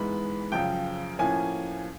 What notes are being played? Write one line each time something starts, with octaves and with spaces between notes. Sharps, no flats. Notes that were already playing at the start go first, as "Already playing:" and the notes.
Already playing: G#2 E3 G#3 B3 B5
F#2 C#3 F3 G5
A2 F3 A#3 C#4 G#5